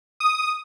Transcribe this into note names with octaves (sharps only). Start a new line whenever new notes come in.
D#6